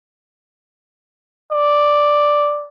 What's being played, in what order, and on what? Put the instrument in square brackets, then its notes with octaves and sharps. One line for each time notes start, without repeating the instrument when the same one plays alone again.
[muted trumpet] D5